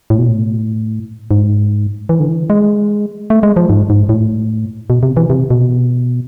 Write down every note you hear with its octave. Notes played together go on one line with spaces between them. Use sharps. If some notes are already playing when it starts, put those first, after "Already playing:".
A2
B2
A2
G#2
E3
D3
E3
G#3
A3
G#3
F3
G#2
G#2
A2
B2
C3
E3
C3
B2